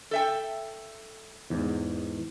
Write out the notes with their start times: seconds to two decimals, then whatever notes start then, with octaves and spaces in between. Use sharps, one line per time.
0.11 A4 E5 G5
1.50 E2 G#2